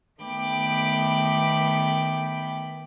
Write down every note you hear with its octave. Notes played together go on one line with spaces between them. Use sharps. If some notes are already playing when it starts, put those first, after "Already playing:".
D#3 A3 B3 G5 B5 D6